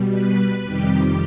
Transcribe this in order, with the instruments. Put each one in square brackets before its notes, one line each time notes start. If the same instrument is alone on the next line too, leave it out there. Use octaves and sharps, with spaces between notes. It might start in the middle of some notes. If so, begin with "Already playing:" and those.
Already playing: [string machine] B2 G3
B4
F2 C3 D#3 G3 G4